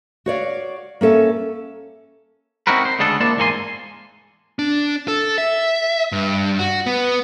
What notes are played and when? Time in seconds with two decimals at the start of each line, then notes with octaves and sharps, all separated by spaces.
0.26 F#4 C#5 D5 F5
1.01 A#3 C#4 A4 E5
2.67 C4 D#4 E4 F#4 A#4 B4
2.85 C5
2.99 D2 C#3 G#3 B3 D4 A4
3.20 A#3 D4 E4 C5 D5 A5
3.37 E2 G#2 A#3 A4 G#5 C6
4.59 D4
5.08 A4
5.38 E5
6.12 G2
6.59 F#4
6.86 B3